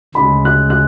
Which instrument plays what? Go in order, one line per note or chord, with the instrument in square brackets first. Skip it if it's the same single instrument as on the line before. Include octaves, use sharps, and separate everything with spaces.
[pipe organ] D2 C#3 G#3 [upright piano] B5
[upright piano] F#6
F#6